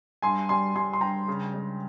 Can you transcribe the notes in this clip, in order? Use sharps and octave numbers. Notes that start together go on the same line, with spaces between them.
G2 G#5 C6
G3 G#5 C6
G3 G#5 C6
C6
G2 G5 A#5
C#3
G#3